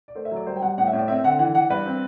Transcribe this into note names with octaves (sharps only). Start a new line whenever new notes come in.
D5
A3 C5
E5
F#3 D5
G3 C5
G5
G3 F#5
A2 F#5
E5
A2
D5
C4 E5
D3 F#5
E3 F#5
E3 F#5
G2 B4
C4